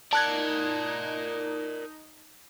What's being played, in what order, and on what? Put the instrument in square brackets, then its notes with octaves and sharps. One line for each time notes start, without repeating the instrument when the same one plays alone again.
[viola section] D#4 [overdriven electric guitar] A#4 D5 [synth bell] A5 F#6 G#6